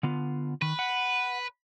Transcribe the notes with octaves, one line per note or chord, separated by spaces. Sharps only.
D3 B3 F4
D#3 B4
F#5